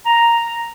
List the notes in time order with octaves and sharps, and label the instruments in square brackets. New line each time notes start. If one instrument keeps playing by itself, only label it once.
[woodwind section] A#5